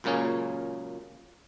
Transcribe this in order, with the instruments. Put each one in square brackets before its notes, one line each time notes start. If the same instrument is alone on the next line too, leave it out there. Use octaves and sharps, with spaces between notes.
[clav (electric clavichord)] C#2 F#2 A#2 A#3 C#4 G#4